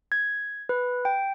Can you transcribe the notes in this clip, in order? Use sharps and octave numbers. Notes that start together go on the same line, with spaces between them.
G#6
B4
G5